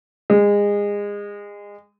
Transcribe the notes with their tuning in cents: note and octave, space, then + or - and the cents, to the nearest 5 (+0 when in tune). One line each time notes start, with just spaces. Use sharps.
G#3 -25